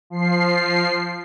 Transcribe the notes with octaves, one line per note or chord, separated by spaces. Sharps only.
F3 C7